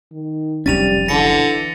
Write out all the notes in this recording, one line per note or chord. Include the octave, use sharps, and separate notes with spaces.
D#3
F1 B1 G3 C#4 A6 D#7 F7
D3 E3 A#6 C#7